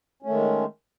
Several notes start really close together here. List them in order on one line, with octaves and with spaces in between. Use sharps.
C#4 A3 D#3 G#3